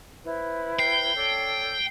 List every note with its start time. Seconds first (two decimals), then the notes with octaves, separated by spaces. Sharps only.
0.24 E4 B4 C5
0.79 G5 C7
1.15 D4 A4 C#5